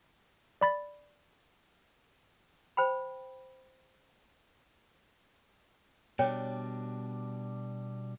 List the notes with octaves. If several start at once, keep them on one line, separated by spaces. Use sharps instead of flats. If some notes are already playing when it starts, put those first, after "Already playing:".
D5 B5 A6
C5 G5 B5
B2 G3 D4 C#5 G5